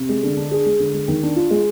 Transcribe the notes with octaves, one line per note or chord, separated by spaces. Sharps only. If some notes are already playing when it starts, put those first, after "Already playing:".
Already playing: C3
G#3
D3
D4
G#4
G#3
D3
G#3
D#3
D4
F4
G#3